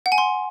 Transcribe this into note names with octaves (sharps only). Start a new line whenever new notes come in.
F#5
G#5
C6